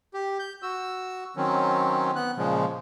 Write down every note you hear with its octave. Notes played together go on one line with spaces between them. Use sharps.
G4
G6
F#4 E6
D#3 F#3 C4 C#4
B3 F#6
A#2 C#3 F3 G#3